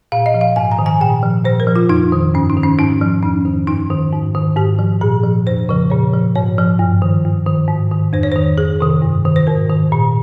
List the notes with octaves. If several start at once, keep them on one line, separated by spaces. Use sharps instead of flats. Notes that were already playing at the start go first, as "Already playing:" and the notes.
A#2 F5
D#5
F3
F5
G#2 G#5
A#5
D#3
G#5
A#2 G5
F3
A#2 C5
A#4
F3
F4
F2 D#4
D#3
G2 C#4
D#4
D#3
C#4
G#2 D#4
F3
F2 C#4
D#3
G2 D#4
D#3
G#2
D#3
G#2 G4
F3
A#2 G#4
F3
F2 C5
C#3 F3
A#2 C#5
F3
G#2 C#5
F3
G2
D#3
G2
D#3
G#2
D#3
F2 C5
C#5
C5
D#3
F2 G#4
C3 D#3
G2
D#3
C5
G#2 A#4
D#3
A#2